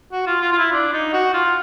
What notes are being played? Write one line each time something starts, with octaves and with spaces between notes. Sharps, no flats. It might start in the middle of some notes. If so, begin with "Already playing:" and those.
F#4
F4
F4
F4
E4
D4
D#4
F#4
F4